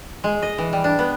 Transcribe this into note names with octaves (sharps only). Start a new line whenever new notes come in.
G#3
D#5
E3
G3
D4
B3